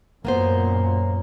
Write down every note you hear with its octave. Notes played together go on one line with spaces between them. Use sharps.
F#2 A#2 A#3 B3 C5